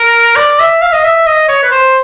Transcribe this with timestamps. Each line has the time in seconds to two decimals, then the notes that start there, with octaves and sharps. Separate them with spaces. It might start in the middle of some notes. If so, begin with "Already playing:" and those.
Already playing: A#4
0.36 D5
0.59 E5
0.82 F5
0.92 D#5
1.04 E5
1.26 D#5
1.48 C#5
1.63 B4
1.71 C5